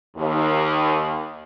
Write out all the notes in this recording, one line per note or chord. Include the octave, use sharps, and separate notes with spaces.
D#2